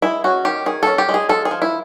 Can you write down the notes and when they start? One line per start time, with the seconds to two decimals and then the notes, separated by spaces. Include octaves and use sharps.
0.02 G#3 E4
0.24 C#4 F#4
0.45 D#3 G4
0.66 D#3 G#4
0.83 C#4 A4
0.98 G4
1.09 G#3
1.14 G#4
1.29 F3 A4
1.45 G#4
1.51 F3
1.62 E4